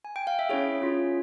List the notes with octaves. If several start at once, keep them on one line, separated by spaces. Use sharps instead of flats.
G#5
G5
F5
E5
C#4 E4 G#4 C#5
C#4 F4 G#4